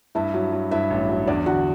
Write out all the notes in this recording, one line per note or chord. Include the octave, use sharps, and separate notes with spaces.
G2 E4 E5
F#3
F#3
G2 E4 E5
A1
F#3
E2 D4 D5
D3 F#4 F#5